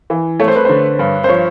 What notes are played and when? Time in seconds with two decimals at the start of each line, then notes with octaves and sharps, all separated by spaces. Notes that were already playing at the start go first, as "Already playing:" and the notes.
0.10 E3
0.40 A3 C#5
0.48 C5
0.56 B4
0.65 D3 C5
0.99 G2
1.24 C5
1.29 F3 C#5